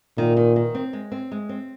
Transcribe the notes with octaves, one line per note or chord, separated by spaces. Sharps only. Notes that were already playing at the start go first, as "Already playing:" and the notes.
A#2 D#3
D#3
D#3
C4
G#3
C4
G#3
C4